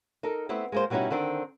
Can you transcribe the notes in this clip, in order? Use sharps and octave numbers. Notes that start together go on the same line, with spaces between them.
D#4 A4 A#4
A3 B3 C4 E4
G#3 A#3 C5
B2 G3 C#4 D#4 E4 F#4
D3 D#3 C4 D4